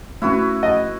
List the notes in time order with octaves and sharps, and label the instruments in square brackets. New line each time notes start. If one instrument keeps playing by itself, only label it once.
[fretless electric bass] A3 C#4 [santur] E4 F#4 B4
[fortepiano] D#5